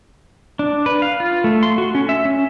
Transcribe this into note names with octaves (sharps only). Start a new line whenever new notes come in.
D4
B4
F5
F4
A3
C6
F#4
C#4
E5
C#4